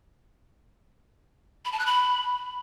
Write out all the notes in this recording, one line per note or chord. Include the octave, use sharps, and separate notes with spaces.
B5
A5
F#6
B5